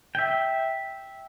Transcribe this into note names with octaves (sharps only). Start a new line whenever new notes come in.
E5 G5